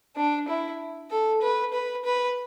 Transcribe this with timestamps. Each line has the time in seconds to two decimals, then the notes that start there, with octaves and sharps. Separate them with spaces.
0.16 D4
0.48 E4
1.10 A4
1.42 B4
1.73 B4
2.04 B4